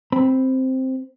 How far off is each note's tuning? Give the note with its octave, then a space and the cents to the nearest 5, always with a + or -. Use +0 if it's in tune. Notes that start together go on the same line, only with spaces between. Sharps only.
C4 +0 B5 +0